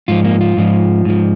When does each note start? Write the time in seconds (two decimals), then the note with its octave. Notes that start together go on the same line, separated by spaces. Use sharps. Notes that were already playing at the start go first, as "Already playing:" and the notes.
0.08 G#2 F3 F4
0.25 A#3
0.40 F4
0.57 G#2 F3
1.05 G#2 F3